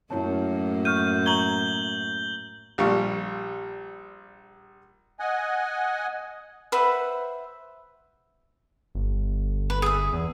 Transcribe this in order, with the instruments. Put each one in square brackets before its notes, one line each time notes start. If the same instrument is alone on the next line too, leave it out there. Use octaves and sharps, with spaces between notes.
[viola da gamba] F#2 A2 A#3 [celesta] E4 C#5 A5
[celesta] C#6 F6 D#7 [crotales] G6
[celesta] A#5 C#6 G#6 [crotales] G6 F#7 G7
[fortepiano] A#1 G3 F4 C#6
[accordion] D#5 F#5 G#5
[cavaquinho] B4 C5 E5 F#5
[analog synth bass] G1
[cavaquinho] B4
G#4 E5
[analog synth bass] E2